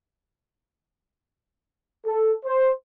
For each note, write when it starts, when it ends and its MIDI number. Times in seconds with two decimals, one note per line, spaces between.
2.05 2.33 69
2.45 2.70 72